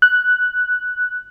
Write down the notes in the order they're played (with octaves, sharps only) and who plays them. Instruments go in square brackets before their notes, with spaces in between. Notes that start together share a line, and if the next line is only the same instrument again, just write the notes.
[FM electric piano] F#6